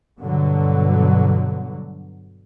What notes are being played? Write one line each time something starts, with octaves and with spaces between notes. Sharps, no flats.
G2 B2 D3 F#3